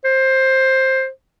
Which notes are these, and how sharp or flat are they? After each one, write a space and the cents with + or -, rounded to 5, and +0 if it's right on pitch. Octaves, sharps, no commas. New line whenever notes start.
C5 +15